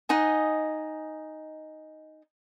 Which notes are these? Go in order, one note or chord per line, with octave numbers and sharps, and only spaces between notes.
D#4 D#5 F#5 G#5